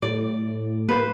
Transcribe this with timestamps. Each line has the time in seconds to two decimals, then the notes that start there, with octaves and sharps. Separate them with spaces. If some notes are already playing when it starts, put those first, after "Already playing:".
0.02 A2 D5
0.89 A#3 B4 C5